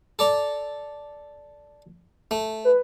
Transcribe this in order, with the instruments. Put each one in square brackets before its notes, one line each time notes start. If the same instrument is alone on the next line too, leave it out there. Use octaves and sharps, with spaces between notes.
[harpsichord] A4 D5 A#5
A3
[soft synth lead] B4